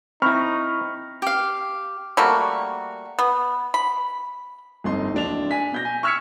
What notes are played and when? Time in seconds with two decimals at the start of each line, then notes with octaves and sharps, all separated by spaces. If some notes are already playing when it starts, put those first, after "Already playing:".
0.22 C4 D#4 E4 B5 C#6 F6
1.22 G4 F5
2.17 G3 A3 A#3 F#4
3.19 B3
3.74 B5
4.84 G1 F2 D#4 D#5 C6
5.14 D1 D4 F7
5.51 G#5 B6
5.72 B2 G6 A#6
5.85 G#5
6.03 C#6 E6 F6 G#6 B6 C#7